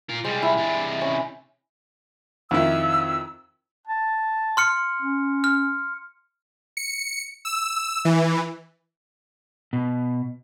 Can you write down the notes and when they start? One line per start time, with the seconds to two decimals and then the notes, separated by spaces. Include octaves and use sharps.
0.09 F4 A#4
0.24 C3 G3 G#3
0.42 E4
0.57 C3 D4
1.01 C#4
2.51 F2 D#3 E4 E6
3.87 A5
4.57 C6 F6 C#7
5.02 C#4
5.44 F6
6.77 C#7
7.45 E6
8.05 E3
9.73 B2